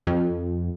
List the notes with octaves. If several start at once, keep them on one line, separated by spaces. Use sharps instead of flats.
F2